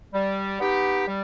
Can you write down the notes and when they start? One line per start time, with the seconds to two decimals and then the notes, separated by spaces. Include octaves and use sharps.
0.14 G3
0.60 B3 D#4 G4
1.08 G3